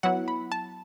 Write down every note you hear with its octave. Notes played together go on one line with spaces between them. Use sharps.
F#3 B3 E4 F#5
B5
A5